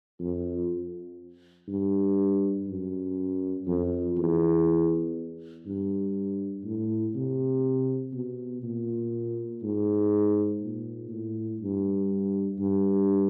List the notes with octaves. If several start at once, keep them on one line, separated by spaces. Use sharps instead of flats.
F2
G2
F#2
F2
E2
G2
A2
C3
B2
A#2
G#2
A#2
A2
G2
G2